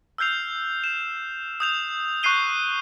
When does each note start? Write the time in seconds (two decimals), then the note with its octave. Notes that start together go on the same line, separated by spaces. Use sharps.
0.18 E6 F6 G6 C7 F7
0.84 E7
1.60 D#6 G6 F7
2.23 C#6 F#6 G6 C7 D#7 G7